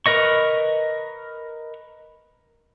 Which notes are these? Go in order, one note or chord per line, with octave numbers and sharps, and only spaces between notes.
A#4 B4 D#5 C#6